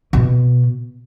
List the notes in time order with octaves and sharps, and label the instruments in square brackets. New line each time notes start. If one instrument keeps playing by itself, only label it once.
[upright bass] B2